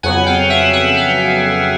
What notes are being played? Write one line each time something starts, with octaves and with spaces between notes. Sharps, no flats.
F2 C#3 F#3 B3 F#5 G#5
F5 G5
E5 F#5
E5 F#5
F5 G5